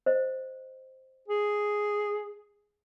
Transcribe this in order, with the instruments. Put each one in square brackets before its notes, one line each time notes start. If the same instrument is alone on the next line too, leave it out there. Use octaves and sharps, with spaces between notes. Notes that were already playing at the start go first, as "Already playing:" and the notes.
[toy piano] C5 D#5
[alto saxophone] G#4